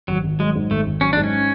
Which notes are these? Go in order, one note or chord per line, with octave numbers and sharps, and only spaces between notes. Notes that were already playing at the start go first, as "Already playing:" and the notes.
G#1 F#3
G#1
F#3 G#3
G#2
G#1 A3
G#1
F#3 C#4
G#2 D4
C#4